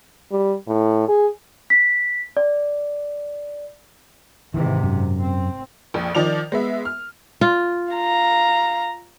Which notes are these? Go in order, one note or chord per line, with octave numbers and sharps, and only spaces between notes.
G3
A2
G#4
B6
D5
G#2 C3 D#3 E3
F#2
C4
A#1 F2
D#3 F3 D5 F7
G#3 B3 E5
F6
F4
F5 A#5